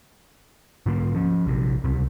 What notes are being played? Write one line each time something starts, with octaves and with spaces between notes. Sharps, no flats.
G#2 D3 A#3
F3 C#4
A#1 C3
C#2 C3